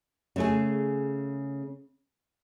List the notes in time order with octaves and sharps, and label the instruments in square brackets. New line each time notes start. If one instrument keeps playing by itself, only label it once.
[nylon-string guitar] C#3 A3 G#4